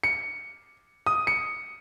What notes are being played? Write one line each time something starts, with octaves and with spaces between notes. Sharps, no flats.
C#7
D#6
C#7